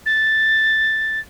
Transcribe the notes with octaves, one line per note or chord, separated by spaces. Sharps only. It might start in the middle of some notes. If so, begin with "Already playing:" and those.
A6